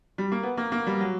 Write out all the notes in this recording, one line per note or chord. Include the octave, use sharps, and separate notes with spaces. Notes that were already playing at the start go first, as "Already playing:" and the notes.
G3
A#3
B3
A#3
A#3
G3
F#3